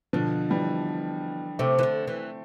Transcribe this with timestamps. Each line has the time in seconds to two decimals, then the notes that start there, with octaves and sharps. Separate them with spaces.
0.13 B2 D3 F3
0.50 E3 G3
1.59 C3 A3 C4
1.79 E3
1.83 D3
2.07 E3